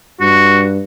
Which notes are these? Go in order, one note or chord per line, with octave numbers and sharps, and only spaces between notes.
G2 F#4